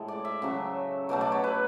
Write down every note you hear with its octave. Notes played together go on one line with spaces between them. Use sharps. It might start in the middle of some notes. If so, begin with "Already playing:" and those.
Already playing: A2 G#3
D5
E5
C#3 F#3 A3
B2 F#3 A3 D5
D5
C#5
B4